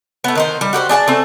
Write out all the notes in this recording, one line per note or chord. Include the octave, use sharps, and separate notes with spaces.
A3 B3
D#3 D#4 C5
G3
F#4 G4 A#4 C5
D4 G#4 F#5 A5
A3 C4